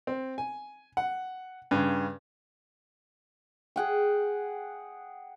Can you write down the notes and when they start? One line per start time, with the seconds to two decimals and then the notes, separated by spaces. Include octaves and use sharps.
0.07 C4
0.38 G#5
0.97 F#5
1.71 G2 C#3
3.76 G#4 F#5 G5